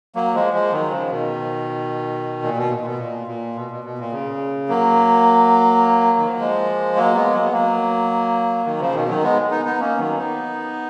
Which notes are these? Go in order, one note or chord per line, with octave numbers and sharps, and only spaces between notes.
F#3 A#3
F3 G#3
F3 G#3
D#3 F#3
C#3 F3
B2 D#3
A#2
B2
A#2
A#2
B2
A#2
A#2
B2
B2
B2
A#2
C#3
F#3 A#3
D#3
F3
F#3
F3 G#3
F#3 A#3
G#3 B3
F#3 A#3
B3
F#3 A#3
D#3 F#3
C#3 F3
B2 D#3
D#3 F#3
G#3 B3
B3 D#4
B3 D#4
A#3 C#4
D#3 F#3
B3 D#4